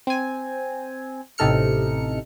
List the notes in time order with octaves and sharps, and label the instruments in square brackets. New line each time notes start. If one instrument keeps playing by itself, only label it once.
[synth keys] C4 G#5
A1 C3 D#4 A4 F6 C#7